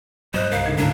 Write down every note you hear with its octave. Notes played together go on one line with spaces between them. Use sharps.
G2 F#3 C5 D#5 F#6
C2 G2 A#4 F5
G#2 D3 D#3 G#6
C#2 F#2 A2 D4 A#4